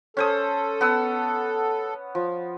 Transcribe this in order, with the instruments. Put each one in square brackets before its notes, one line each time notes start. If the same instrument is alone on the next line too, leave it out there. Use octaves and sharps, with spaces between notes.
[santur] C#4 C5 D#6 [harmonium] A4
[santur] B3 F#5 E6
F3